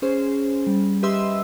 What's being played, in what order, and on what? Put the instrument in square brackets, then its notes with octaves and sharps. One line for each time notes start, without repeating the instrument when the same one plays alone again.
[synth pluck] C#4 G#4 C5
G3
G4 B4 D#5 E5 C6 E6